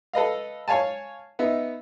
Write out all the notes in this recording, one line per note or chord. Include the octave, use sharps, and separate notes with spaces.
A4 B4 D#5 F5
C#5 F5 G#5 A5
B3 D#4 E5